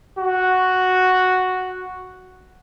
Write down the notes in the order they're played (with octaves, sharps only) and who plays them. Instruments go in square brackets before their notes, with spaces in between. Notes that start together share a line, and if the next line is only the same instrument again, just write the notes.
[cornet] F#4